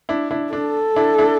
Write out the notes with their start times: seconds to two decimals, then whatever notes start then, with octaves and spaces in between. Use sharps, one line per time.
0.09 D4 E4
0.31 D4 E4
0.53 D4 A4
0.96 D4 E4
1.18 D4 E4